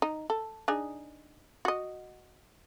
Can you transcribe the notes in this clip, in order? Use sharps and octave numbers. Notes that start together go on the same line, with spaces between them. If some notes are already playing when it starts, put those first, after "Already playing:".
D#4
A4
D4 D#4 G#4
F#4 D#5